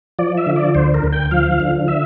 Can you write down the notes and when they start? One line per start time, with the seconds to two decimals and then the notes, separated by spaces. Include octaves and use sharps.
0.19 F3 D5
0.38 E5
0.47 D3
0.56 D5
0.75 D2 C5
0.94 A#4
1.04 D2
1.12 G5
1.31 F3 F5
1.60 D3
1.88 E5